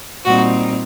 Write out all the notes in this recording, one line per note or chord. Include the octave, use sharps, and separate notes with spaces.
A#2 G3 C4 D#4 F#4